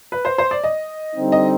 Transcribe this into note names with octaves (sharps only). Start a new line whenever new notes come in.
B4
C5
C5
D5
D#5
D3 G3 C4 D#4
D#5